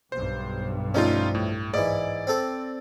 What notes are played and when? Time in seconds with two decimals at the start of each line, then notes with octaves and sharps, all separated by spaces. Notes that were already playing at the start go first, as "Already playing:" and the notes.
0.12 B1 G2 C5
0.94 F3 G3 A3 C#4 D#4 F4
1.35 A2
1.74 G#2 E3 D5
2.27 C4 A4